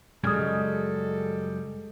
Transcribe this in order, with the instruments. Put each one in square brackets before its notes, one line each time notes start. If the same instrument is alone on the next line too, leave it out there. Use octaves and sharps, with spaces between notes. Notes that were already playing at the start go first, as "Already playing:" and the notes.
[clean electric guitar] F#2 C#3 G3 [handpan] G#3 [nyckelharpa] A4 [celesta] D#6 F6 G#6